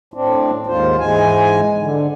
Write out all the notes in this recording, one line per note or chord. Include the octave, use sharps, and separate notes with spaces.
A2 C4 D4
D#2 G#2 F4 C5
G#2 E3 G#3 G#5
D3